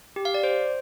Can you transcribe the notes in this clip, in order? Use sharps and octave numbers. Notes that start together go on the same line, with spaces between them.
G4
F5
D5
C5